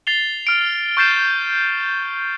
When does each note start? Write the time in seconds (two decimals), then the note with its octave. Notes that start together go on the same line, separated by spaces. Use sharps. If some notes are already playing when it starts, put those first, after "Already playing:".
0.07 A6 C7 F7 G7
0.47 F6 D7
0.97 C#6 F6 G6 A6 C7 E7